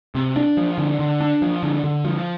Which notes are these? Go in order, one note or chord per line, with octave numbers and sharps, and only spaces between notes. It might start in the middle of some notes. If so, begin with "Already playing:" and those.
C3
D4
F3
D3
D3
D4
F3
D3
D3
F3